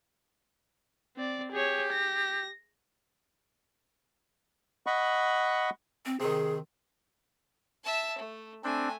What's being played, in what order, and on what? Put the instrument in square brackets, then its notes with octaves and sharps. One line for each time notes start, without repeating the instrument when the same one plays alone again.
[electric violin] C4 D5
[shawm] G4 [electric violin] G#4 C#5
[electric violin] A#6
[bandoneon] D#5 F#5 B5 C#6
[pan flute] C4
[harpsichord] C3 D#3 [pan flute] G#4
[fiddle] E5 A5
A3
[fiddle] A3 G#5 [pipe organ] C4 D4